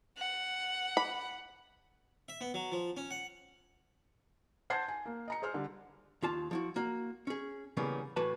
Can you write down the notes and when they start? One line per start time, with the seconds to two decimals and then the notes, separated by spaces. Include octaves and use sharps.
0.18 F#5
0.97 B5
2.29 E5
2.41 B3
2.54 F#3
2.72 F3
2.97 C#4
3.11 F#5
4.70 C5 F#5 A5 G6 G#6 C7
4.88 G#5
5.06 A#3
5.28 D#5 A#5 C#7
5.42 G#4 C5 C6 F6
5.54 D3 G3
6.22 D#2 F4 A5
6.51 F3 E4 F#4
6.76 A#3 F#4
7.27 C#4 G#4
7.77 C#3 E3 G3 A#3 B3
8.16 A2 E3 F#4 B4 A5